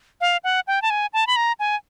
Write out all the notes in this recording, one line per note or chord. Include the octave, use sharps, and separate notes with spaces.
F5
F#5
G5
A5
G#5
A5
B5
A#5
G#5